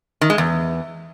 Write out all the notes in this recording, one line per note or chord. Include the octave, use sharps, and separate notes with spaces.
D#3
G#3
E2